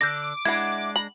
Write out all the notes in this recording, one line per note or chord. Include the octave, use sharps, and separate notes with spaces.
D3 D4 D6 G6 A#6
G#3 D4 E4 F#5 G#6
A#5 F#7